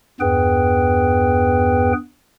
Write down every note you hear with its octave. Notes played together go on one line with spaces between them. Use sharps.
E2 G2 B3 G#4 B4 G5